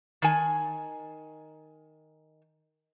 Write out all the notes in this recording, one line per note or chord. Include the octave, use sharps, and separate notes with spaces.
D#3 G#5